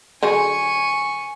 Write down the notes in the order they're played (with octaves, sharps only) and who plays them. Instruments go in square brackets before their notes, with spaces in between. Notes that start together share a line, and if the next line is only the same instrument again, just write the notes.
[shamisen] D3 F#3 G#4 [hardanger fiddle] G#5 C#6